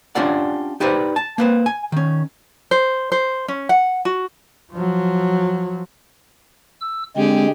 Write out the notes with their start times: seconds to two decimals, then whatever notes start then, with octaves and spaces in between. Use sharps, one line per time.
0.15 C#4 D4 F4 G4 D5 F#5
0.80 D#4 G4 B4 C5 D5
1.16 A5
1.38 A#3 B4 C5
1.66 G#5
1.92 D#3 C#4
2.71 C5
3.12 C5
3.48 C#4
3.69 F#5
4.05 F#4
4.72 F3 F#3
6.81 E6
7.16 D3 G#3 C4 G4 G#4